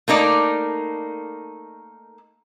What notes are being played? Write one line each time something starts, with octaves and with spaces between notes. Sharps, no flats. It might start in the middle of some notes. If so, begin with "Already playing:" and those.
A3 A#3 D#4 D5